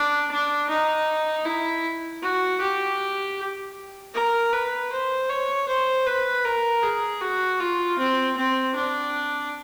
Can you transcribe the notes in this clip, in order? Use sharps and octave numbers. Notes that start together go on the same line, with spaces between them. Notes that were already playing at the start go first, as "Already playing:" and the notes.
Already playing: D4
D4
D#4
E4
F#4
G4
A#4
B4
C5
C#5
C5
B4
A#4
G#4
F#4
F4
C4
C4
D4